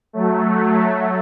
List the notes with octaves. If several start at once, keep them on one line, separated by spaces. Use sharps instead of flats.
F#3 A3